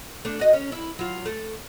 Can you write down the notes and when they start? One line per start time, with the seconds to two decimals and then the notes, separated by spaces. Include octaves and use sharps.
0.25 A3 D4
0.39 F#4 D#5
0.53 C#4
0.72 E4
0.99 F#3 F4
1.26 A3